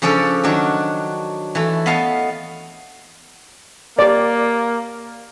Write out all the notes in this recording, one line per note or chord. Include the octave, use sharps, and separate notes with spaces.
C#3 F3 C#4 D4 A4 D5
D#3 F#3 D4 F#4
E3 A3
B3 D#5 F5 A5
A#3 G4 D5